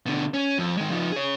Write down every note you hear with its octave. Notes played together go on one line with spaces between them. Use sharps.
B2 D3
C#4
F2
D#3 G#3
F3 D#4
G#4 C#5